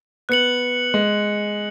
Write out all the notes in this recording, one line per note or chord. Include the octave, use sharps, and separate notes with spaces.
B3 F#6 C#7 F#7
G#3